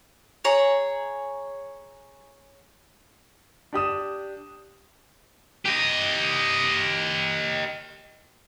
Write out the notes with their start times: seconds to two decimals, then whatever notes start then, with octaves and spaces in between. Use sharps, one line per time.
0.45 G#4 C#5 A#5
3.73 D4 G4 D#6 E7
5.66 G4 D#5